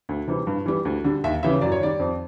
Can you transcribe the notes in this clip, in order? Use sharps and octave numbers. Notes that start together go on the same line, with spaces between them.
D2
C3 E3 G3
G2
E3 G3
D2
D3 G3
D#2 E5
C#3 E3 G3 E5
F#2 D5
C#5
D#3 G3 D5
F2